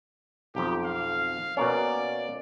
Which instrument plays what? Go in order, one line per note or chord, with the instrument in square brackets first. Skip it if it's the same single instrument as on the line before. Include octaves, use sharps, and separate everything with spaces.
[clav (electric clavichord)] B1 F2 [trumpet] G4
[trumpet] F5
[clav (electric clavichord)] B2 A#3 C#4 [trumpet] D5